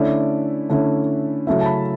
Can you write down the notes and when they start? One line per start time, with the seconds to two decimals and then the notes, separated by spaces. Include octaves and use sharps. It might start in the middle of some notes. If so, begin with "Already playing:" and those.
Already playing: D3 A3 C#4 E4 D5
0.70 D3 A3 C#4 E4
1.47 C#3 F#3 A3 C#4 E4 E5
1.61 A5
1.66 B5